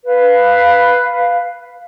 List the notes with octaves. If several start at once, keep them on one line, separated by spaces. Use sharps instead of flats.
B4 F5